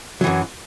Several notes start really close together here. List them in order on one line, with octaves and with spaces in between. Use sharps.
F#3 E3 F#2